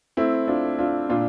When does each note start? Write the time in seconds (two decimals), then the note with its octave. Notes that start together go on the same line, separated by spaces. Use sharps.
0.17 A3 C4 E4
0.48 D4 F4
0.64 A3
0.79 D4 F4
1.09 A#2 D4 F4